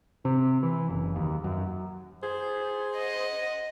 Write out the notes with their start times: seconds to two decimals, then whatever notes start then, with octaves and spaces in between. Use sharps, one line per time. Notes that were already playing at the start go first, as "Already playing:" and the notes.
0.25 C3
0.63 E3
0.89 F#1
1.16 D#2
1.44 F#2
2.23 G#4 C5
2.97 D#5 F#5